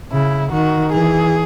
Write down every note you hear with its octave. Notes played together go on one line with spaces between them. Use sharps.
C#3 E4
D#3 F#4
E3 G#4